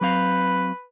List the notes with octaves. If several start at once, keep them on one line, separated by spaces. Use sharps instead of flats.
F#3 C4 B4 F5